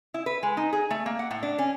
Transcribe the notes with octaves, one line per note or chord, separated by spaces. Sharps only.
E4
B4
G#3
D#4
G#4
A3
A#3
F#5
A2
D4
C#4